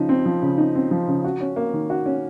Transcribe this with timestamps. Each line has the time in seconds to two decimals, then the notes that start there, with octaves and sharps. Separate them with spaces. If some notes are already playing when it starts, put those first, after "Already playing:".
Already playing: C#3 F3 D#4
0.09 C4
0.26 F3
0.42 C#3
0.58 D#4
0.75 C4
0.91 F3
1.08 C#3
1.24 F#4
1.41 C#4
1.56 A#3
1.74 D#3
1.90 F#4
2.06 C#4